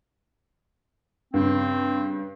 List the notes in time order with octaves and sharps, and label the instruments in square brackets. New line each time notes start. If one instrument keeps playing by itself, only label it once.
[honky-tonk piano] G2 C#3 [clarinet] C4